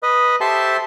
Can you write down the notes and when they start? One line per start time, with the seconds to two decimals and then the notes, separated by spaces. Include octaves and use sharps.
0.03 B4 D#5
0.41 G4 A4 C5 E5 A5 C6